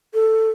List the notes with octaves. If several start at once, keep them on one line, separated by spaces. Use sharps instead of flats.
A4